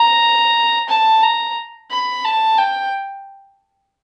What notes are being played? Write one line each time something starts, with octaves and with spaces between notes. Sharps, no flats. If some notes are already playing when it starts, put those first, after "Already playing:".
Already playing: A#5
A5
A#5
B5
A5
G5